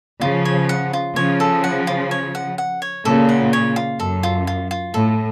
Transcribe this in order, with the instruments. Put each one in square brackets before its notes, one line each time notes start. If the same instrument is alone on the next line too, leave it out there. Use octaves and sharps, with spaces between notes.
[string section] C#3 F3 [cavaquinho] F4
[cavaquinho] C#5
F#5
F4
[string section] C#3 F3 [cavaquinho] C#5
[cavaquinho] A4
F#5
F4
C#5
F#5
F#5
C#5
[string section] A#2 C#3 [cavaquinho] A4
[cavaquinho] F#5
C#5
F4
[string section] F#2 [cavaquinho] A4
[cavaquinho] F4
F4
F4
[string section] A2 [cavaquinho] A4